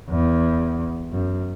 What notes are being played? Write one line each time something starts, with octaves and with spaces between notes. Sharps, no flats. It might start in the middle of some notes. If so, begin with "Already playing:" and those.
E2
F#2